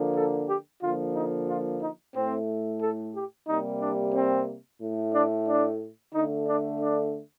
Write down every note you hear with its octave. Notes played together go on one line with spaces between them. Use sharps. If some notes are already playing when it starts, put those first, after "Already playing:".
Already playing: D3 F3 A#3
A4
G4
D3 F3 A#3 F4
D#4
F4
D#4
A2 A3 C4
A4
G4
C3 G3 A#3 D#4
D4
C4
A2 A3
D4
D4
D3 A3 D#4
D4
D4